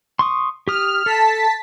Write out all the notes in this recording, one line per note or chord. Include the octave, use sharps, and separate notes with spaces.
C6 C#6 D#6
G4 D#6 F6
A4 A5 B6